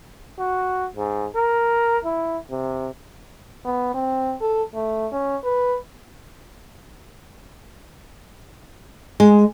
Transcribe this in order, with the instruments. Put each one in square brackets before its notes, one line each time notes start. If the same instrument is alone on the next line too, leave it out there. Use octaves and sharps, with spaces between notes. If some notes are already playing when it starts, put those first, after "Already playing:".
[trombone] F#4
G#2
A#4
E4
C3
[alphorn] B3
C4
A4
A3
C#4
B4
[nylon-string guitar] G#3